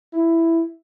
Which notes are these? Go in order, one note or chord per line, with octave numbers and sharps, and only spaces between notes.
E4